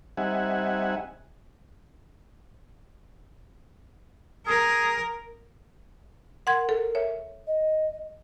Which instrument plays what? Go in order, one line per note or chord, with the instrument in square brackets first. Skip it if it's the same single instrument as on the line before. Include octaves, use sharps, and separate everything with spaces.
[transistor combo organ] G3 C4 D#4 E5 F#5 G#5
[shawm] G#4 [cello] A#4
[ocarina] A#4 [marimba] F#5 C6 G#6
[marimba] A4
C#5 E5
[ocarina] D#5